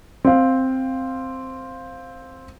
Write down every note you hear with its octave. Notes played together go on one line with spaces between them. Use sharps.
C4 F5